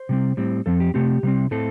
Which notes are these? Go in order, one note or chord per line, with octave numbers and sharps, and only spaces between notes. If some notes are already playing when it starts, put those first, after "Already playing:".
Already playing: C5
C3 G3 C4
A2 G3 C4
F2 F3 C4 A4
G4
C3 A3 C4 G4
C3 G3 C4
A2 A3 C4 A4